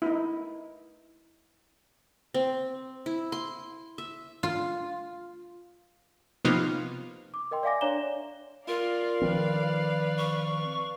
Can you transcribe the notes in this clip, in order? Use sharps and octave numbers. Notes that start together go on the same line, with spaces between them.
D#4 E4
C4
E4
C6
E5
F4
C3 F3 A#3 B3 D#4 F4
D6
A#4 D#5 G5 C6
D5 E5 F5 G#5 D6 A#6
D4 C#5 D5 A#5 E7 G7
F4 A#4 D5 F5
D#3 F3 C4 B4
C#6